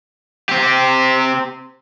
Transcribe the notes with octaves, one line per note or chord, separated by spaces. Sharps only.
C4 G4